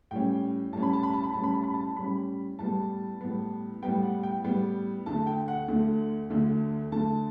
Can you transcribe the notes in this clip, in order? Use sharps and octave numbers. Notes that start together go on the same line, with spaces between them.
A2 G3 C#4 G5
A2 G3 C#4 A5
B5
A5
B5
A5
B5
A2 G3 C#4 A5
B5
A5
B5
A5
A2 G3 C#4 B5
A2 G3 B3 A5
A2 G3 B3
A2 G3 B3 G5
F#5
G5
A2 G3 B3
D2 D3 A3 A5
G5
F#5
D2 D3 A3
D2 D3 A3
D2 D3 A3 A5